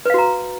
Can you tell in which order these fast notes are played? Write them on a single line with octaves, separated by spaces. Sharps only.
B4 F5 F#4 A#5